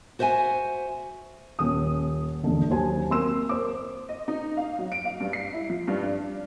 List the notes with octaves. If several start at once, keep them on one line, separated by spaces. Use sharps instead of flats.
F#4 C5 E5 F#5 G#5
D#1 C#4 D#6
E1 A#1 D3
D#2 F#3 C5 G#5 A5
A#3 C4 C6 E6 E7
A#4 C5 D6
D#5
D#4
F5
F#3
D7
F5
G2
C7
E4
F3
G2
D4